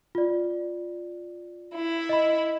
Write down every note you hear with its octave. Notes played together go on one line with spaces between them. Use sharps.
F4 D5
E4
D#5 B5